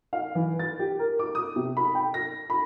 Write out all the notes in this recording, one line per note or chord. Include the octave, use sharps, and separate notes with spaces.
F5
E3
A6
G4
A#4
D6
D#6
C3
B5
G5
A#6
B5